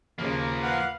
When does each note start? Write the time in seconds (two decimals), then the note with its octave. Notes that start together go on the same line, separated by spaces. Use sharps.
0.18 D#2 C#3 F3 A#3
0.63 B4 F5 F#5